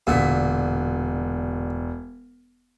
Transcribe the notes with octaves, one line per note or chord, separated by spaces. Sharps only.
E1 A#2 D3 B6